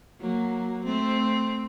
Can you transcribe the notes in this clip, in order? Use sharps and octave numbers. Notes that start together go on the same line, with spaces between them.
F#3 A#3
A3 C4